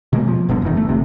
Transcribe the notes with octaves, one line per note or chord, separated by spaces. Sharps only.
B2 D3 G#3 A#3
F3
F#1 G2 B2 D3
F#1 E2 D#3
A3
G1 C3